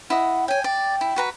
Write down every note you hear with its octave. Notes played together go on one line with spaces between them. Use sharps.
E4 D#5 F#5
C#5 G5 G#5
D5 G5
E4
F#4 B4 A#5